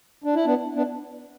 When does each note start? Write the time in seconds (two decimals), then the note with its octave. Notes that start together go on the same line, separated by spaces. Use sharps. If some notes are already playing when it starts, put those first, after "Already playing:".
0.24 D4
0.35 E4
0.45 B3 D4
0.75 B3 D4